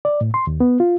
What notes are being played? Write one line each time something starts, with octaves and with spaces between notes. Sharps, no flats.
D5
A2
C6
D#2
B3
F4